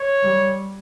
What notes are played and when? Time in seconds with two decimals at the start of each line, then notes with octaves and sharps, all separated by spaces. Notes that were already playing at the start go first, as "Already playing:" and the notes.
Already playing: C#5
0.22 G3